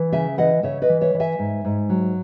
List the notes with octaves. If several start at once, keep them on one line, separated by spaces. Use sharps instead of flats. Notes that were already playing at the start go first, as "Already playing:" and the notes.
Already playing: E3
C#3 E5 G#5
E3 D#5 F#5
C#3 C#5 E5
B4 D#5
E3
C#5 E5
E3
E5 G#5
G#2
G#2
F#3